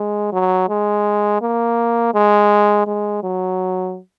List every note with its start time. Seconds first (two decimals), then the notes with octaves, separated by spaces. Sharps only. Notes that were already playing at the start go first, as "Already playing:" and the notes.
Already playing: G#3
0.33 F#3
0.69 G#3
1.42 A#3
2.14 G#3
2.87 G#3
3.23 F#3